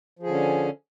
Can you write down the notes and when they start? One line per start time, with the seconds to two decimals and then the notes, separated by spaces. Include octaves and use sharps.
0.19 F3
0.23 G#4
0.26 D3
0.30 C#4